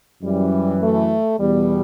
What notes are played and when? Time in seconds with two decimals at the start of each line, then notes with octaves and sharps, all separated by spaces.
0.22 F#2 E3 G3
0.81 A3
1.39 E2 B2 G3